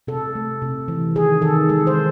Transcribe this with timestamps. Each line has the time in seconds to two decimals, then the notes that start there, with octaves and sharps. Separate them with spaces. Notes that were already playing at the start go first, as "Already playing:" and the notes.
0.07 C3 A4
0.35 A3
0.62 C3
0.88 E3
1.16 D#3 G#4
1.42 D#3 A4
1.69 G#3 A4
1.87 C5